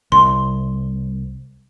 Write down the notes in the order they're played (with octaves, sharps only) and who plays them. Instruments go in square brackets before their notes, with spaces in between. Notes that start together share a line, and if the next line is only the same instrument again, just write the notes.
[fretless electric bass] C2 [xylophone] C6